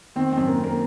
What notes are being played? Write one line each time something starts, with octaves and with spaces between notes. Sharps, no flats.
D#3 C4
F#2 C4
A#3
C4
A#3